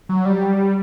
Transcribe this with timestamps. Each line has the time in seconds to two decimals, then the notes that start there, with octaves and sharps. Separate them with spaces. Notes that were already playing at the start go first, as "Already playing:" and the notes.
0.09 F#3
0.25 G3